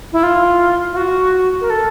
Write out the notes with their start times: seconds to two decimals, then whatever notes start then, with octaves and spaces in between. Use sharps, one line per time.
0.13 E4
0.23 F4
0.92 F4
0.97 F#4
1.61 A#4
1.70 A4